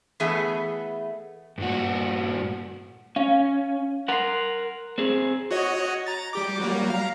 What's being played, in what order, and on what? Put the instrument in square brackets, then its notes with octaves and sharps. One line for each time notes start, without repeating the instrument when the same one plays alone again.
[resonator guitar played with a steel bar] E3 A3 B3 G#4 E5
[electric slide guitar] G2 A#2 F#4
[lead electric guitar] C#4 [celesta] F5
[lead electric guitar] A#4 F#5 [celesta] C6 C7
[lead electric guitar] C4 G#4
[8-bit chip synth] F#4 C#5 D#5
A#5 A6
G3 G4 D6
F#3 G3 A#3
F5 A#5